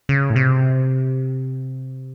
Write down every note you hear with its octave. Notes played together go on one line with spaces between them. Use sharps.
C#3
A2
C3